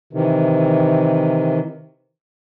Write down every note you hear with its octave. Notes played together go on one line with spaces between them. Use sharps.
C3 D#3 E3